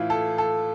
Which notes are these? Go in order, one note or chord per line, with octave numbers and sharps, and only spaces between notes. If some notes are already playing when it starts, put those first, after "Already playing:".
Already playing: A2 E3 E4 F4
A4
A4